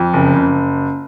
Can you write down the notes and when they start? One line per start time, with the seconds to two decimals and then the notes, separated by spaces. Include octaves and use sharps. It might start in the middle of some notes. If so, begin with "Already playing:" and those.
Already playing: F2
0.14 F#1
0.36 F#1